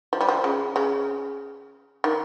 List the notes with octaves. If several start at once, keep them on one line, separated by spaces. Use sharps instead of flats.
F3
G3
F3
C#3
C#3
D#3